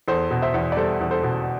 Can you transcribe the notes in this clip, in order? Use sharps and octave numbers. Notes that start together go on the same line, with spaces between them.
E2 A4 C5
B2
C5 E5
E2
D5
G3 A4 C5
E2
A4 C5
B2